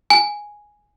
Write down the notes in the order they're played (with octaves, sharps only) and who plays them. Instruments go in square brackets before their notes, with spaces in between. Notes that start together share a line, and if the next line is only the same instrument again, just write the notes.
[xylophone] G#5